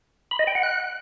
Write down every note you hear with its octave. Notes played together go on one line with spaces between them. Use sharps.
B5
D#5
G5
F#5
F#6